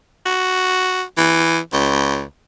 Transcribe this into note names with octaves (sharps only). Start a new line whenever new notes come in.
F#4
E3
C#2